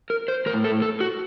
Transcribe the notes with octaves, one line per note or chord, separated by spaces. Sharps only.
A#4
C5
A2 A#4
A4
A4
F#4